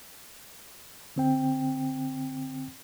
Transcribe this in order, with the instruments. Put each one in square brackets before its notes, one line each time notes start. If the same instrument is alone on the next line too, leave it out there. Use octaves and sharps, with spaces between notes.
[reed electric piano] D3 C4 G5